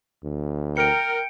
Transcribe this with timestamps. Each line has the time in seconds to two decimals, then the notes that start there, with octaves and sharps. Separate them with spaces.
0.24 D2
0.77 A#4 G5 C#7 D7